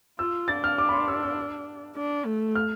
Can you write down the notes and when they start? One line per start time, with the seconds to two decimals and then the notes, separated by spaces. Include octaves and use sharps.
0.19 F4 E6
0.48 D4 A6
0.64 F6
0.78 D6
0.89 B5
0.93 C6
1.08 E6
1.23 E6
1.96 D4
2.25 A3
2.55 F6